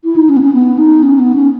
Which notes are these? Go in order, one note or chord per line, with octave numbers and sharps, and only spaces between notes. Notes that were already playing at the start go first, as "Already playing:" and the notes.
E4
D#4
C#4
B3
C#4
B3
D#4
C#4
B3
C#4